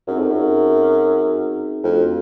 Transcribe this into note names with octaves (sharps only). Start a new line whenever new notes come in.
F#2 C4 D#4 G#4
F2
F#2
F2 A3 D4 F#4